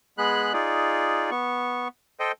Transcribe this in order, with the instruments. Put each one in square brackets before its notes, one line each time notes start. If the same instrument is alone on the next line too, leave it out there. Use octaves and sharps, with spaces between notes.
[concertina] G#3 B3 G#4 B5 F#6
D#4 F4 G#4 D5
B3 C#6
A4 C5 D#5 G5